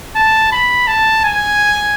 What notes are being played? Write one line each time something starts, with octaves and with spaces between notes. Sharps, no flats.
A5
B5
A5
G#5